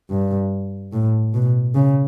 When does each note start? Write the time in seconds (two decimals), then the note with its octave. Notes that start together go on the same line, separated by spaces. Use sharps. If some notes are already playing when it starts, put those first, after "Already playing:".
0.10 G2
0.93 A2
1.34 B2
1.75 C#3